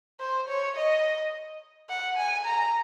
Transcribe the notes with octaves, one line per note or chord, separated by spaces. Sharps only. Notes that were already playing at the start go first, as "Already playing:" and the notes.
C5
C#5
D#5
F#5
G#5
A#5